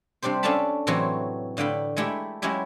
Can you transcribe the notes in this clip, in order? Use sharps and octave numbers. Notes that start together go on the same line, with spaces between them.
C3 G3 D4 G4 C5
C#4 D4 A4 F5 A5 B5
A2 C3 E3 F#3 C4 F#4
A2 D3 F5 G5 B5
G#3 A3 E4 G4 B5
F#3 G#3 C#4 E4 G4